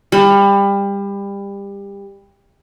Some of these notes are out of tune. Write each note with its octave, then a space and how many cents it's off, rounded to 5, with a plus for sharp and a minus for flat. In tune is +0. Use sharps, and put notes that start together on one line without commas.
G3 +25